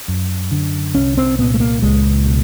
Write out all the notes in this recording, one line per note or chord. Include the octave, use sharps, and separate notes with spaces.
F#2
D3
C2 C#4
C4
A#2 B3
A3
A#3
C#2 G#3
B2